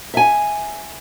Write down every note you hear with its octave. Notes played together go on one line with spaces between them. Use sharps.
E5 G#5